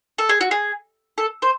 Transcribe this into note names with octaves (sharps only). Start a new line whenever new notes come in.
A4
G#4
F#4
G#4
A4
C5